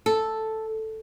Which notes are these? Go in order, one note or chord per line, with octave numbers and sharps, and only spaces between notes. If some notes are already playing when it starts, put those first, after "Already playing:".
A4